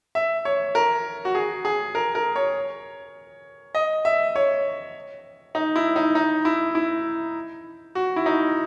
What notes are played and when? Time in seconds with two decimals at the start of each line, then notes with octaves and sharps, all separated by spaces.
0.15 E5
0.45 C#5
0.75 A#4
1.25 F#4
1.35 G#4
1.65 G#4
1.95 A#4
2.15 A#4
2.36 C#5
3.75 D#5
4.05 E5
4.36 C#5
5.55 D#4
5.76 E4
5.96 D#4
6.15 D#4
6.45 E4
6.75 E4
7.95 F#4
8.16 E4
8.26 D#4